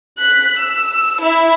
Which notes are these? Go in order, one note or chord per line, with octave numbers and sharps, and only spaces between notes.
F#6 B6
E6
E4 E5